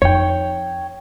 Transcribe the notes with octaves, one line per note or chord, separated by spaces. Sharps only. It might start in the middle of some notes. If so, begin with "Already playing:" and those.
F2 D#4 C#5 G5